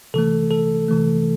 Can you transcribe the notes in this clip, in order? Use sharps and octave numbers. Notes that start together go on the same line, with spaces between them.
C3 E3 A3 A4
A4
C3 E3 A3